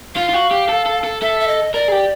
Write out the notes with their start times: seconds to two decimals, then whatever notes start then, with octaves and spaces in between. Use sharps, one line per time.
0.15 F4 F5
0.29 F4
0.33 F#4
0.51 G4
0.69 A4
0.86 A4
1.04 A4
1.22 A4 E5
1.40 E5
1.48 D#5
1.74 A#4 D5
1.88 G#4
1.92 G4